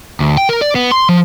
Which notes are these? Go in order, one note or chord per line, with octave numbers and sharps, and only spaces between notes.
D2
G5
A#4
D5
B3
C6
F3